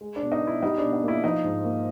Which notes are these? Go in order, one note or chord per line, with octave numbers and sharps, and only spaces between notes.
G#3
D4
B2
D#4
B3
E4
G3 D#4
D4
B2
D#4
A#3 E4
F3 D#4
G#2
A#3